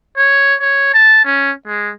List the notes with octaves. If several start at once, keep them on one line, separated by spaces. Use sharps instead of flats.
C#5
C#5
A5
C#4
G#3